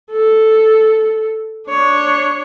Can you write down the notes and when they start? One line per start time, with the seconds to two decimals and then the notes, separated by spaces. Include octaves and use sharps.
0.11 A4
1.69 D4 C#5